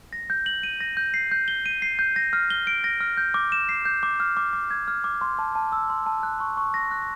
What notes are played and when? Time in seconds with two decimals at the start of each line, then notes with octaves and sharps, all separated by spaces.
0.13 A#6
0.30 G6
0.46 F#7
0.63 D#7
0.81 A#6
0.97 G6
1.14 C7
1.31 G6
1.48 G7
1.66 D#7
1.82 C7
1.99 G6
2.16 A#6
2.33 F6
2.50 G7
2.67 D7
2.84 A#6
3.00 F6
3.17 G6
3.34 D6
3.52 E7
3.69 C7
3.85 G6
4.03 D6
4.20 F6
4.37 D6
4.53 D6
4.71 G#6
4.88 F6
5.04 D6
5.21 C6
5.39 A5
5.55 A5
5.72 E6
5.90 C6
6.06 A5
6.23 F#6
6.40 C#6
6.57 C#6
6.74 A#6
6.91 F#6